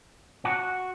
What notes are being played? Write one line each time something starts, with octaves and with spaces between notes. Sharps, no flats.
F#4